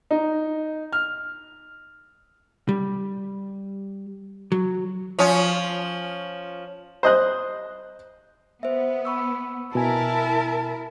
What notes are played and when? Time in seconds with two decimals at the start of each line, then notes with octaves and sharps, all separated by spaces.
0.11 D#4
0.93 F6
2.69 G3
4.52 F#3
5.19 F3 C#4
7.03 C5 D#5 F#6
8.63 B3 C5 E5
9.05 B5 C#6 E6
9.75 B2 E4 A#4 G#5 A5